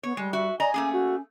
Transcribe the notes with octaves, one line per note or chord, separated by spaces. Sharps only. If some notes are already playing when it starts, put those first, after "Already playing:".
B3 C#5
G3 G#3
F#4 E5
D5 D#5 G#5 A#5
A3 A#3 C#4 G#4
F#4